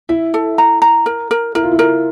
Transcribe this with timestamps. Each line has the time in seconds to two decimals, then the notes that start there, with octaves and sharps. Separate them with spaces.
0.09 E4 E5
0.34 A4
0.58 A#5
0.82 A#5
1.06 A#4
1.31 A#4
1.55 E4 A#4
1.63 F4
1.72 E4
1.79 A#4